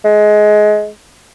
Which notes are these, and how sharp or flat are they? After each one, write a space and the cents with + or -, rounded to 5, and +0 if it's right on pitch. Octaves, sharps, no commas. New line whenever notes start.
G#3 +20